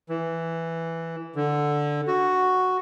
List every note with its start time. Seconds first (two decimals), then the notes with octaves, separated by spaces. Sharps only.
0.09 E3
1.35 D3
2.07 F#4